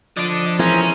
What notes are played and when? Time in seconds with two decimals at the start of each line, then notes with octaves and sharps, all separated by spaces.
0.17 D3 F3 D4 D5 D#5
0.59 E3 C4 C#4 G#4 A#4